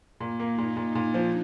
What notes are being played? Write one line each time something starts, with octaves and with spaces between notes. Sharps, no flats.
A#2 A#3
A#3
D#4
A#2
A#2 D#4
A#2
D4
F3